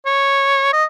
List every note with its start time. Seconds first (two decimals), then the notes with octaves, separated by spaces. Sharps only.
0.06 C#5
0.73 D#5